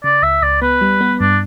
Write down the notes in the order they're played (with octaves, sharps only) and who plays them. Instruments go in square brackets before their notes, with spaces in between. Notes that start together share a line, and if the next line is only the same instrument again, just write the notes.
[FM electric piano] C#3 [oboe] D5
[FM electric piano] C#2 [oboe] E5
[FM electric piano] C#2 [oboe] D5
[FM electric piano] B3 [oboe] B4
[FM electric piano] G3
B3
[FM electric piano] G2 [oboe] D4